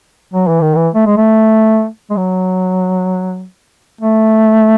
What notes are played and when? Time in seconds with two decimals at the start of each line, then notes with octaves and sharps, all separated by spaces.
0.34 F#3
0.48 E3
0.61 D#3
0.75 E3
0.94 A3
1.06 G#3
1.17 A3
2.10 G#3
2.17 F#3
4.01 A3